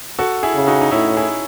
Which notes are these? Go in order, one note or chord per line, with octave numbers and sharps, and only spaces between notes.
F#4 A4
E4 G#4
C#3
D#4 F#4
D#4
A2 C#4 E4
E4 G#4